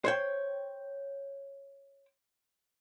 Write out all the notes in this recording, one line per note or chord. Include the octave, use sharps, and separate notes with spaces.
C5 C#5 G5